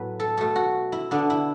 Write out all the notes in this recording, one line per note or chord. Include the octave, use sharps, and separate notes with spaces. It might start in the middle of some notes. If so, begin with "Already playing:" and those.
Already playing: A2 F#3 B3 B4
A4
B2 A3 A4
F#4
E4
D3 B3 D4
E4